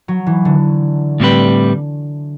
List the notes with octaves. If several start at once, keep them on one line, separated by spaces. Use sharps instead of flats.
F#3
E3
D3
A2 G3 C4 G4 B4